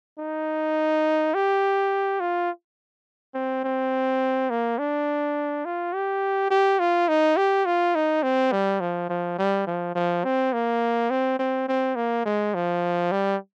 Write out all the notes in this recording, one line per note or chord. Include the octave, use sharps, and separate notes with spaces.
D#4
G4
F4
C4
C4
A#3
D4
F4
G4
G4
F4
D#4
G4
F4
D#4
C4
G3
F3
F3
G3
F3
F3
C4
A#3
C4
C4
C4
A#3
G#3
F3
G3